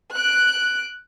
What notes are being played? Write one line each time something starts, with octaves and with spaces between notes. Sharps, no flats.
F#6 D7